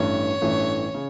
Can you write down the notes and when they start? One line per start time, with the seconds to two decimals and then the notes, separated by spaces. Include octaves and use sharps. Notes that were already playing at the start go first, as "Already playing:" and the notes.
Already playing: A1 G2 E3 A3 C#5
0.41 A1 G2 E3 A3
0.95 C#3